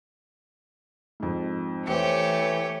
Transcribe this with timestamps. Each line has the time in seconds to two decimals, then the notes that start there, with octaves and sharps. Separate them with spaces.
1.20 F2 G#2
1.87 E3 A3 G4 C5 C#5 C#7